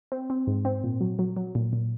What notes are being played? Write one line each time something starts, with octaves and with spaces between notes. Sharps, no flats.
C4
C4
G#2
C4
A#2
F#3
F#3
F#3
A#2
A#2